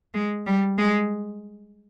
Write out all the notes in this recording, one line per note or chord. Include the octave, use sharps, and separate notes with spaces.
G#3
G3
G#3